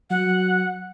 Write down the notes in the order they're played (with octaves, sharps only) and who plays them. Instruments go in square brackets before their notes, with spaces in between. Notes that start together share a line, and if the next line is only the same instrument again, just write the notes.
[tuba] F#3 [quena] F#5